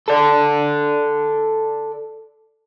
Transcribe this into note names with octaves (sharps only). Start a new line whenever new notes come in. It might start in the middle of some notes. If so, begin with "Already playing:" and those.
A4 D5